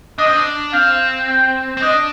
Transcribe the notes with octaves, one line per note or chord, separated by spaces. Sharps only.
D4 D#5
C4
D4
C4 F5
G5
C4
D4 D#5